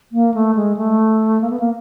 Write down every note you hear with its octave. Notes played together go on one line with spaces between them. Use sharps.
A#3
A3
G#3
A3
A#3
B3
A#3